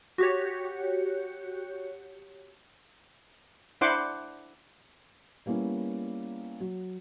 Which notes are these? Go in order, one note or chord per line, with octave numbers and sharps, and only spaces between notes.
F#4 G4 C#5
D4 E4 C5 F#5 C6 D6
G3 A#3 B3 C#4 E4
F#3